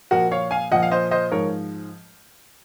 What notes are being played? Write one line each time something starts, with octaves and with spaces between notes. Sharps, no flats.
A#2 F3 F#4 A#4
C#5 F5
F5 G#5
A#2 F3 D#5 F#5
F5
C5 D#5
C5 D#5
G#2 F3 A#4 C#5